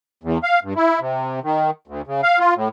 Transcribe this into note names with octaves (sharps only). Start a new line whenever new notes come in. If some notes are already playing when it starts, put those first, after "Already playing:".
E2
F5
G2
E4
C3
D#3
D2
C#3
F5
F4
A2